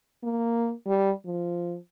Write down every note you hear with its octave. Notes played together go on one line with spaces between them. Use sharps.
A#3
G3
F3